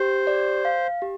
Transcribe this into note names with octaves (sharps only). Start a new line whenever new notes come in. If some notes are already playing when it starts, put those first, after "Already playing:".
Already playing: G4 C5
D5
F5
G4